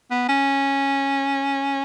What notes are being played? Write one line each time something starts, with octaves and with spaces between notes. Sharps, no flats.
B3
C#4